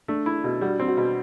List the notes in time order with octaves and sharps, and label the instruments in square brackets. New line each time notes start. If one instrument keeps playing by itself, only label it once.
[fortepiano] A3 [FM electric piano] D4
[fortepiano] E4
B2
[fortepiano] G3 [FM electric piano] F#4
[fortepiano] C4
[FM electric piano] F#4
[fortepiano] B2